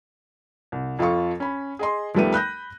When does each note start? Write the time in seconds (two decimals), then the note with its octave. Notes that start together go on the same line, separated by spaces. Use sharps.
0.72 C2
0.99 F2 F4 A4 F5 C#6
1.40 C#4 B5
1.79 G#4 D#5 C6
2.15 D#2 F3 G3 A3 B3 D#7
2.32 B5 F#6 G6 A#6